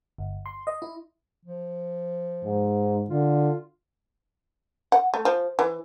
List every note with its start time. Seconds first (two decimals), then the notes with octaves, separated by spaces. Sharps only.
0.18 G1
0.46 C6
0.67 D#5
0.82 E4
1.45 F3
2.44 G#2
3.10 D3 F4
4.92 F#5
5.14 A3
5.25 F3
5.59 E3